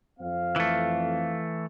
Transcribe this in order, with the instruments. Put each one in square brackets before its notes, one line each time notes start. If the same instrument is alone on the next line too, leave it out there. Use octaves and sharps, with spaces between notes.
[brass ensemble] F2 C4 F5
[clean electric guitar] E3 A3